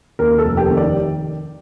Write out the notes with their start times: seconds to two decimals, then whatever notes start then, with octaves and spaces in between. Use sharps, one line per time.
0.19 D#2 A#4
0.38 A4
0.45 F1
0.57 G4
0.70 D#3
0.77 D5